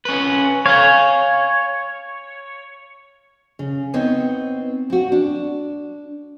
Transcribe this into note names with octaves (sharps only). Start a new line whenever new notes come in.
C#4 B4
C#5 F5 G#5
C#3
B3 C4 D#4 C#5
C4 F#4
D4